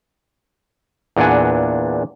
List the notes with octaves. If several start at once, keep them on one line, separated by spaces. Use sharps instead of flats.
E2 A#2 D4 F#5 G#5